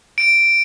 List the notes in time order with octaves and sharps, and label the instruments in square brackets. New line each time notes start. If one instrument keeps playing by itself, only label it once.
[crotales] D7